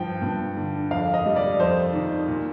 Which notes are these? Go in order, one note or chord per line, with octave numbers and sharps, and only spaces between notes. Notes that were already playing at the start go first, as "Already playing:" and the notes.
Already playing: G2 F3 G5
G2
D3
F2 F5
D#5
G3
D5
F2 C5
D#3
A#2